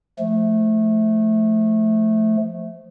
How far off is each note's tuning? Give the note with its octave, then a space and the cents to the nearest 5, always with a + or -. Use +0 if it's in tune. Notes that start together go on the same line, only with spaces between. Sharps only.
F3 +0 A3 -10